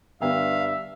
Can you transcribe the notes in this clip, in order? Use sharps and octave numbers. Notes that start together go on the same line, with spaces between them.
G2 D3 B3 D4 E5 F5